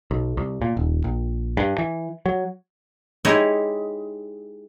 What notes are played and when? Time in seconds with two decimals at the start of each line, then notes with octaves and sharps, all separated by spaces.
0.11 B1
0.37 C2
0.62 A#2
0.77 D#1
1.04 A#1
1.57 G2
1.78 E3
2.26 F#3
3.25 G#3 D#4 E4 G4 C#5 D#5